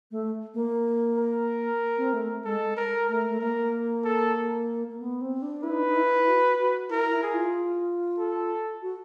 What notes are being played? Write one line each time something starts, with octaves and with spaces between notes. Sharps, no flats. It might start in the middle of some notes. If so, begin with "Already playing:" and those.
A3
A#3
A#4
C4
A3
G#3 A4
A#4
A3 A#4
A3
A#3 A#4
A4
A#3
B3
C4
D4
E4 B4
D#4
D4
D#4
E4
F#4
F#4
E4 A#4
E4
G#4
F4
A4
F#4